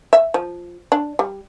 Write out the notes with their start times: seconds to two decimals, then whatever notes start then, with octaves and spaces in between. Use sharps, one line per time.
0.13 E5
0.34 F3
0.92 D4
1.19 G3